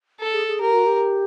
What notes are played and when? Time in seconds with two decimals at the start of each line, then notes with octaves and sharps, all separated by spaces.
0.20 A4
0.33 G#4
0.48 G#4
0.60 G4 A#4
0.73 F#4
0.86 G4